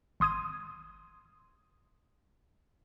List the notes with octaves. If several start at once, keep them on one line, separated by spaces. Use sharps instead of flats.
G#1 C6 D#6 G#6 D#7